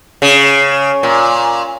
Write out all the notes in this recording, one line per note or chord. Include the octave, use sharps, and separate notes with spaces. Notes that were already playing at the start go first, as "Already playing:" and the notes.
C#3
A#2